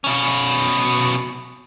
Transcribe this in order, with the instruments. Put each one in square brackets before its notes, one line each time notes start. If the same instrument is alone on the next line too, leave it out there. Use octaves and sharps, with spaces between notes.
[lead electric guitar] B2 C#4